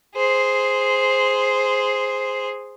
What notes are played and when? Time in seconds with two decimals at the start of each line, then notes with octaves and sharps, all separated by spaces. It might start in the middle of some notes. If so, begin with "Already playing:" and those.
0.16 G#4 C5